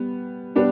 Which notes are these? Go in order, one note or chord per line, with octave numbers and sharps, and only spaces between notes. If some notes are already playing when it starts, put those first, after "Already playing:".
Already playing: G3 B3
G3 B3 D4